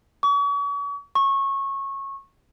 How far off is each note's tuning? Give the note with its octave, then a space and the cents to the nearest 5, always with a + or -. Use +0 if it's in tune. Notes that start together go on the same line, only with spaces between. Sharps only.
C#6 +40
C#6 -20